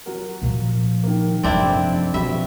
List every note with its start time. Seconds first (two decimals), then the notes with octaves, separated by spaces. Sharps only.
0.06 F#3 F#4 A#4
0.42 A#2 F3
1.03 D#3 A#3
1.43 F1 F#2 F3 C4 D4 E4 A6
2.14 B2 F3 E5 B5